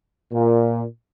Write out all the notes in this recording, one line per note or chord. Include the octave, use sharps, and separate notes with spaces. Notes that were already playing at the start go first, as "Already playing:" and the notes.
A#2